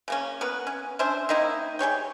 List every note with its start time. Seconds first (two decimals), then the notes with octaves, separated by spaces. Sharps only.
0.08 C#3 A#3 C#4
0.41 B3 A#4 B4
0.67 C#4
0.99 C#4 D4 C5 E5
1.29 D#3 A#3 D#4 E4
1.79 G3 G#4 C#5 G5